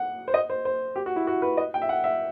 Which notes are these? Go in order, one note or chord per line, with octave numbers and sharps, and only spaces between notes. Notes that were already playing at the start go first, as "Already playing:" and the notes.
Already playing: F#5
C5
D#5
C5
C5
G4
F#4
E4
F#4
B4
D#5
G5
E5
F#5
E5